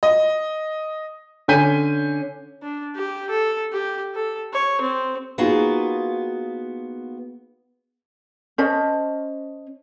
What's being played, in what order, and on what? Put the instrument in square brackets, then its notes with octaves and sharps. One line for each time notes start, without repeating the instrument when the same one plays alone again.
[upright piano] D#5
D3 C#4 G#5 G6 B6 D#7
[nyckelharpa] D4
G4
A4
G4
A4
C#5
C4
[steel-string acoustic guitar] A#3 B3 D#4 F4 F#4 G#4
[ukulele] C#4 C5 D#5 A5